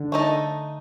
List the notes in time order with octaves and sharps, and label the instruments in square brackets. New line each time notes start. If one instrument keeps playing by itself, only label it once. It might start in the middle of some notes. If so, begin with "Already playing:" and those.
Already playing: [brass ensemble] D3
[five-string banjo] A3 D#4 A4 D#5